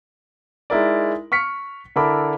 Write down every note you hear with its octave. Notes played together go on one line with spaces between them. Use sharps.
G#3 D#4 E4 A#4 D5
C#6 F6 B6 C#7
D3 E4 A4 A#4 B5 D6